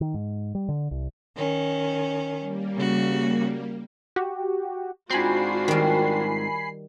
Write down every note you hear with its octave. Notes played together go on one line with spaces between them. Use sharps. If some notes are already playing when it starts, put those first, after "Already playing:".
D#3
G#2
G3
D3
C2
D#3 C#4
G3 A#3
C#3 F#4
F#4 G4
G#2 C4 D4 F4 F#4 G#5 B5 C7
D#3 G3